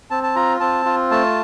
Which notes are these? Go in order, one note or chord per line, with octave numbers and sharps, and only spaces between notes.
C4 A5
A5
F4 A#5
C4 A5
F4
A3 A5